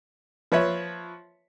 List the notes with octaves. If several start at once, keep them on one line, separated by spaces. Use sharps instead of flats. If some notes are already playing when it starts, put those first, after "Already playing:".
F3 B4 C#5 E5